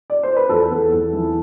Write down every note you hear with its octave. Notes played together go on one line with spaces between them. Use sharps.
D5
C5
B4
E2 A4
E2
E2
E3